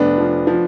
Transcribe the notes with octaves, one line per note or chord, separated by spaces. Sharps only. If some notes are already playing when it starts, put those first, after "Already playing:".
Already playing: F1 B3 D4
F3
F3